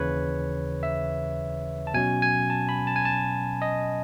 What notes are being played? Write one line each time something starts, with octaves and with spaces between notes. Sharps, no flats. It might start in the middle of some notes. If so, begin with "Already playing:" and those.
Already playing: D#2 C#3 E3 B4 C#5
E5
A5
B2 F#3 C#4 G#5
G#5
A5
B5
A5
G#5
A5
D#5